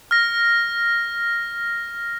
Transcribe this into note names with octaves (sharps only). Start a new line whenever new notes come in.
F6 A#6